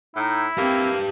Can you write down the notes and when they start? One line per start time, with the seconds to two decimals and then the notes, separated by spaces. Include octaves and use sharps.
0.16 A2 D#4 E4
0.58 A#3 C4 G4 B4